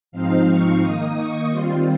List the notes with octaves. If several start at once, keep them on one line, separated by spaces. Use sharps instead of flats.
G#2 F3 C4 D#4 F5
C#6
D#3 A#3 D#4 D#6
C#6
D#3 G3 C4 F4 C6